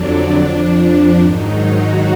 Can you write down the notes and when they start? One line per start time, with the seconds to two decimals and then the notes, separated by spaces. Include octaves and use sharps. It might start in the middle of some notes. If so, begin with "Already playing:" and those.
Already playing: F2 D3 F#3 D4
0.35 F2 F3
1.17 G#2 D#3 F#3 D#4
1.58 F#4